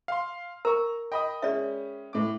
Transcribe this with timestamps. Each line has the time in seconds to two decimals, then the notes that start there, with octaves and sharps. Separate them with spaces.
0.08 F5 C6
0.65 A#4 A#5 C#6
1.12 D#5 G5 B5 D#6
1.42 G#3 C#4 D5 E5
2.13 A2 D6